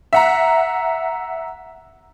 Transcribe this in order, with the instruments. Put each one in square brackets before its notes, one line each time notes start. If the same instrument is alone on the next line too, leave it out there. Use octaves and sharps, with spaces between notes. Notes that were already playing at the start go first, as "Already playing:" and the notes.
[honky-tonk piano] E5 F#5 A#5